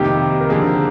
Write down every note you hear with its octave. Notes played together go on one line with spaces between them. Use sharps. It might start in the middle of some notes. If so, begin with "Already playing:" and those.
Already playing: F2 C3 D#3 A#3 D#4 G4
A#4
D3 F3 A#3 G#4